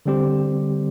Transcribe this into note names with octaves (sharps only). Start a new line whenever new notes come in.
D3 G3 C4 G4